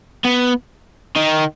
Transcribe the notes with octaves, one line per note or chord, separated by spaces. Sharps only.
B3
D#3